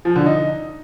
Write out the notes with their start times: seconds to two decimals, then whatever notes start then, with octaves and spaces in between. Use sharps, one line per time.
0.05 F3
0.16 D3
0.26 D#4